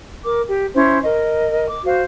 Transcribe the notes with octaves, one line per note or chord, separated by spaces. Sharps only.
A#4 D6
G4
C#4 E4 C5
A#4 D#5
D6
F#4 C5 F5